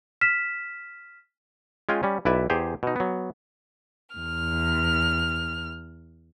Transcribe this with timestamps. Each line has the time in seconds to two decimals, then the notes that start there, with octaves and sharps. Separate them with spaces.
0.21 F6 B6 E7
1.89 G#3 C#4 F4 G5 G#5
2.03 G3 C#4
2.25 B1 E4 B4 D5 E5
2.50 E2 G4 G#4 C5
2.83 B2 D#4
2.96 F#3 B3
4.15 E2 F6